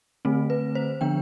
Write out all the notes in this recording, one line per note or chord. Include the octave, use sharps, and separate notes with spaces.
D3 A3 C4
B4
C5
D3 F3 B3 D4 G5